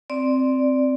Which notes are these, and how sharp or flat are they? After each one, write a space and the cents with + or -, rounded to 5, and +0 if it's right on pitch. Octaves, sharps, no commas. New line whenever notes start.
C4 +0 D5 +0